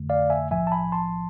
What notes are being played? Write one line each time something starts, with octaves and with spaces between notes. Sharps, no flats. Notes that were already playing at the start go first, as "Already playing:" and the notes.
Already playing: F2 D3 A3
D5 F5
E5 G#5
B1 A2 F3 E5 G#5
A5
G#5 B5
A5 C6